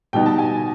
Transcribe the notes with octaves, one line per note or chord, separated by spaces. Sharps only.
B2 G3 B3 D#4 G5
A5
G#5